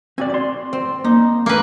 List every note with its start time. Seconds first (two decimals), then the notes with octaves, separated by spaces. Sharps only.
0.18 C4 F#4 D5 G#5
0.30 D5 C6
0.73 C4 C5
1.04 A#3 D#4
1.46 A3 A#3 B4